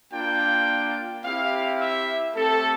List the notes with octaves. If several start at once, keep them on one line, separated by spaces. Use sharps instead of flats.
A#3 D4 F4 G5
C4 E4 G4 F5
E5
A3 C4 G4 A4